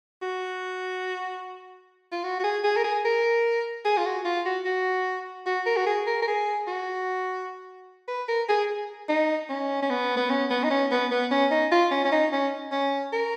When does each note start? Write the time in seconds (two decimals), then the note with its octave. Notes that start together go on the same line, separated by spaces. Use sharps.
0.22 F#4
2.12 F4
2.24 F#4
2.39 F#4
2.43 G#4
2.64 G#4
2.76 A#4
2.84 G#4
3.05 A#4
3.85 G#4
3.97 F4
4.05 F#4
4.25 F4
4.45 F#4
4.65 F#4
5.46 F#4
5.66 A#4
5.77 F#4
5.86 G#4
6.07 A#4
6.22 A#4
6.27 G#4
6.67 F#4
8.08 B4
8.28 A#4
8.49 G#4
9.09 D#4
9.49 C#4
9.82 C#4
9.90 B3
10.17 B3
10.30 C#4
10.50 B3
10.64 D#4
10.70 C#4
10.91 B3
11.11 B3
11.31 C#4
11.51 D#4
11.72 F4
11.91 C#4
12.04 C#4
12.12 D#4
12.32 C#4
12.72 C#4
13.13 A#4